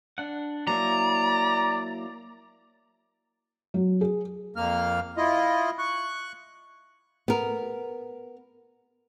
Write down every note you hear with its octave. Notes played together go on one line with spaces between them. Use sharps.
D4 F#5
F#3 A#3 E4 D5 A#5
F#3
G#4
F2 A#3 F6
E4 F4 D#5
C#6 F#6
B3 A#4